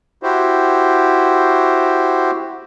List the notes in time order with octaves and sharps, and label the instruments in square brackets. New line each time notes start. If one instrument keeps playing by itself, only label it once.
[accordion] E4 F#4 G4 C5